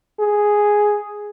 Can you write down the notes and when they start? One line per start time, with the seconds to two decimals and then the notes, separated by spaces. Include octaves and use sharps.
0.20 G#4